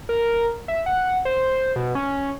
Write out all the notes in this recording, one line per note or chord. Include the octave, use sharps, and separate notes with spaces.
A#4
E5
F#5
C5
B2
C#4